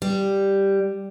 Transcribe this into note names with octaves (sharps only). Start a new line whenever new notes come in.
G3